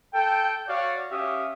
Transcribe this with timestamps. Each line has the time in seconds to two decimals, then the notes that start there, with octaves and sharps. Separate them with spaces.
0.14 A4 G5
0.68 F#4 C#5 D5 F5
1.11 C#4 G4 E5 F5 D#6